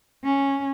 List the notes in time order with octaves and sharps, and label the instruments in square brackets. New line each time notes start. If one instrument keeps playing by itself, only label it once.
[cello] C#4